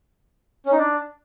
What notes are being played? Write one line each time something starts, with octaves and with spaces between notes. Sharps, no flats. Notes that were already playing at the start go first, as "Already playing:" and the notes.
C#4
D#4
D4